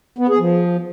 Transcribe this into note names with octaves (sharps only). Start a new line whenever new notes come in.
B3
G#4
F3